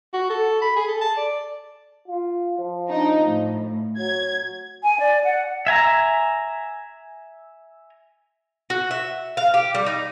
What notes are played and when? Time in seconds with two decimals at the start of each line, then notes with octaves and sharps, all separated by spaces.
0.13 F#4
0.30 A4
0.62 B5
0.76 G#4
0.88 A4
1.01 A5
1.17 D5
2.08 F4
2.59 F3
2.89 D4 D#4
3.24 A2
3.98 F#3 G#6
4.83 G#5
4.99 D5
5.24 F#5
5.67 E5 G#5 A#5
8.70 F#4
8.91 E5
9.37 F5
9.54 G4
9.75 G3
9.86 D#4